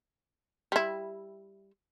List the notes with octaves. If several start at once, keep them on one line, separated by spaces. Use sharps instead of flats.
G3 E4